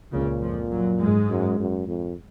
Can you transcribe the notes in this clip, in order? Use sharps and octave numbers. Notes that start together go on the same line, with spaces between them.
C#2 A#2 C#3
F2 F3
F#2 F#3
G#2 G#3
F#2
F#2
F2